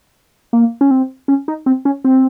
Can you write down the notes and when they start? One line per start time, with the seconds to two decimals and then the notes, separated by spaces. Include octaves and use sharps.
0.53 A#3
0.81 C#4
0.91 C4
1.28 C#4
1.48 D#4
1.66 C4
1.85 C#4
2.05 C4